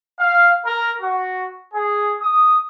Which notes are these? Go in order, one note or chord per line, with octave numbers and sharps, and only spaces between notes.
F5
A#4
F#4
G#4
D#6